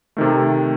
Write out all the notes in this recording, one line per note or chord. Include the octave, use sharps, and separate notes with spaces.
C3 D#3 A3